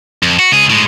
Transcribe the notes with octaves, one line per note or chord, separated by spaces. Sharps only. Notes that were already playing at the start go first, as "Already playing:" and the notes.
F2
F#4
C#2 G#4
A2 G#3